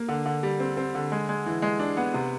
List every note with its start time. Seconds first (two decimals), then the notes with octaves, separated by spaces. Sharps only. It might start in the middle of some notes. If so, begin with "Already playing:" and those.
Already playing: A#3
0.09 D3
0.26 D3
0.43 G3
0.60 C4
0.77 C4
0.95 D3
1.12 G#3
1.29 G#3
1.46 E3
1.62 G#3
1.79 D4
1.97 B3
2.14 C3